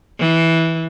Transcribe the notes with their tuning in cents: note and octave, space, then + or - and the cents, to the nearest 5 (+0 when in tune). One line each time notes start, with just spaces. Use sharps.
E3 -10